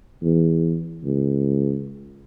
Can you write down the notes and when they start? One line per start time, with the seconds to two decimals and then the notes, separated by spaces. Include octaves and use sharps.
0.23 E2
1.04 C#2